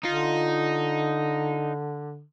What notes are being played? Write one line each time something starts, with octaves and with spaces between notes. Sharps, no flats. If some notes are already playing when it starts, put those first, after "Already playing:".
D3 D#4 F4